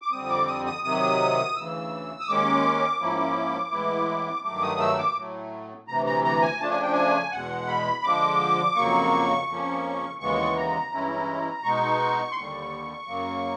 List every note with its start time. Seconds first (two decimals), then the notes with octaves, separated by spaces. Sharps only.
0.02 D6
0.12 F2 D3 G3 C4 D#6
0.30 D6
0.48 D#6
0.66 D#6
0.84 C3 D#3 F#3 D#6
1.55 D2 C#3 E3 E6
2.21 D#6
2.28 D#2 D#3 G#3 C#4 D6
3.00 G#2 F3 A#3 C#4 E4
3.71 A2 E3 G#3 B3 E4
4.43 G2 D#3 F#3 A3 D6
4.62 D#6
4.80 E6
4.98 D6
5.16 A2 F#3 A3
5.88 D2 C3 E3 A#5
6.06 A#5
6.24 A#5
6.42 G#5
6.60 C#3 F3 A3 D4 A5
6.71 G#5
6.82 G5
6.92 G#5
7.32 E2 B2 G#3 F#5
7.68 B5
8.04 D3 F3 G#3 D6
8.75 F2 C#3 F#3 A#3 C#6
9.48 F2 C#3 F3 A#3 C#4
10.20 D#2 C#3 E3 G#3 B3 C#6
10.57 A#5
10.92 G2 E3 G#3 C#4 E4
11.64 B2 G#3 B3 D#4 C#6
12.32 C6
12.36 D#2 D3 G3 C#6
13.08 F#2 C#3 F#3 A#3